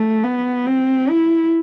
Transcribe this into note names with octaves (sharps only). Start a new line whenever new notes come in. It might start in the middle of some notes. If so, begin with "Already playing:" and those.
Already playing: A3
B3
C4
E4